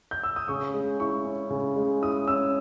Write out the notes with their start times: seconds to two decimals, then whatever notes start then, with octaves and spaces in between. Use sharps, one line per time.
0.11 G6
0.23 E6
0.36 D#6
0.48 C#3 C#6
0.74 G#3
1.00 E4 C#6
1.25 C#4
1.50 C#3
1.76 G#3
2.02 E4 D#6
2.28 C#4 E6